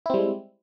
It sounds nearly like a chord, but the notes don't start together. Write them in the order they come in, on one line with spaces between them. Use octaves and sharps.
E4 C4 G3 G#3